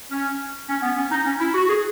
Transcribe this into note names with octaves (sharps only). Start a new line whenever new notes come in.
C#4
C#4
B3
C#4
D#4
C#4
E4
F#4
G#4